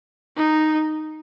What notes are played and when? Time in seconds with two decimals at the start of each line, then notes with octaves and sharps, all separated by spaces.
0.37 D#4